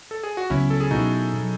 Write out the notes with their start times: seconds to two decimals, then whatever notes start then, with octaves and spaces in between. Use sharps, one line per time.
0.11 A4
0.23 G#4
0.37 F#4
0.50 C#2 C#3 F#3 B3 C#4 E4
0.70 A4
0.81 G#4
0.91 B2 F#3 B3 D#4 E4 F#4
1.34 B2 F#3